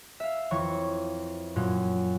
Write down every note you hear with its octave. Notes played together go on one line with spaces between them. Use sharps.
E5 F5
F2 E3 C#5 C#6
F#2 A#2